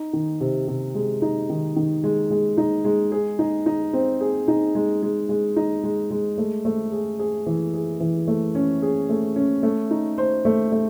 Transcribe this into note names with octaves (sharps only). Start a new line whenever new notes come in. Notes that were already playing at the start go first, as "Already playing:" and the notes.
Already playing: D#4
D#3
C3
C3
G#3
D#4
D#3
D#3
G#3
G#3
D#4
G#3
G#4
D#4
D#4
C4
G#4
D#4
G#3
G#3
G#3
D#4
G#3
G#3
A3
A3
G#4
G#4
E3
G#4
E3
A3
C#4
G#4
A3
C#4
A3
D#4
C5
A3
A3